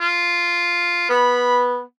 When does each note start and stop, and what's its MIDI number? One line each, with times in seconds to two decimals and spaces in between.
0.01 1.05 65
1.10 1.81 59
1.10 1.63 83